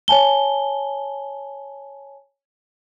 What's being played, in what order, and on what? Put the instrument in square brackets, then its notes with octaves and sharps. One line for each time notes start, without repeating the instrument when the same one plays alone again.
[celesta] C#5 G#5 A5 G7